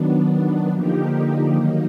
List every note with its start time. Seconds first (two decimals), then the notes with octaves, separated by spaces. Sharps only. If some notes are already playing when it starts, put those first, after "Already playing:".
Already playing: D#3 F#3 B3 D4
0.70 D3 F3 A#3 D#4 G4
1.54 D#3 F#3 A#3 D#4